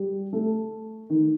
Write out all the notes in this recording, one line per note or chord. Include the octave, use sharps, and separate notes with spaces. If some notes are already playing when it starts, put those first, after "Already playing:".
Already playing: G3
A3
D#3